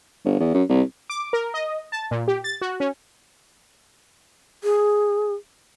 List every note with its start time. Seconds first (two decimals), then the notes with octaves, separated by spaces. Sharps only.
0.25 G1
0.40 E2
0.54 F#2
0.69 C2
1.10 D6
1.33 A#4
1.54 D#5
1.92 A5
2.11 A#2
2.28 G4
2.44 A6
2.61 F#4
2.80 C#4
4.64 G#4